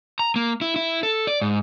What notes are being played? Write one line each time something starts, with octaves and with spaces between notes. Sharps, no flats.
A#5
A#3
E4
E4
A4
D5
G#2